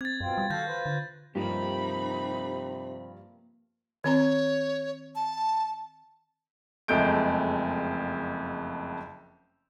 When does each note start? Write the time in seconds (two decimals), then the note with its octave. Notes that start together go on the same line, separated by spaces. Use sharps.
0.01 C4 G#6 A6
0.21 F#2 B2 C4 F4
0.38 G3
0.50 D#3 F#4 A4 F5 G6 G#6 A#6
0.67 F4 B4 C5
0.86 D3
1.35 G2 C3 F3 A#3 D#4 G4 B5
4.04 D#3 C4 C#5 A#5
5.15 A5
6.88 F#1 F2 G#3 A3 G6 D7